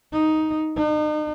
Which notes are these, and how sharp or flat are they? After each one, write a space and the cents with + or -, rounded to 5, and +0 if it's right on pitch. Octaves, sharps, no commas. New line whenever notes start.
D#4 +5
D#4 -40